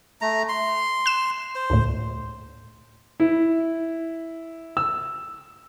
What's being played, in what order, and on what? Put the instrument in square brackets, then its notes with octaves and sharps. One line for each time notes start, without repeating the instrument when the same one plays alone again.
[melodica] A3 A#5
C6
[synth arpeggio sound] F#6 E7
[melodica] C5
[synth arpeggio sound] D2 A2
[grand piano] E4
E6